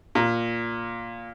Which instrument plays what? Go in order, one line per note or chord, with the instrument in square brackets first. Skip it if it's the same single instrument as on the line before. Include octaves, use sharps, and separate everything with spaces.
[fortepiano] A#2